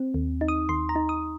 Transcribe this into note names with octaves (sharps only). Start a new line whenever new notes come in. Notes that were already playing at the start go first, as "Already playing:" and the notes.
Already playing: C4
D#2
D#4
D#6
D#2 C6
A#5
D#4
D#6